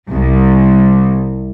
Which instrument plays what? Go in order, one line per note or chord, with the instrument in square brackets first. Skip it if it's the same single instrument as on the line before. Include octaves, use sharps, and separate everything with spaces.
[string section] C2